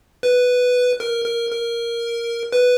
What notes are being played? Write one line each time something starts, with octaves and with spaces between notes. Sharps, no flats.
B4
A#4
A#4
A#4
B4